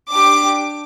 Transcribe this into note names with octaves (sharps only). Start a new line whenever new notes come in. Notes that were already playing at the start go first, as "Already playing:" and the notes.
D4 G4 D6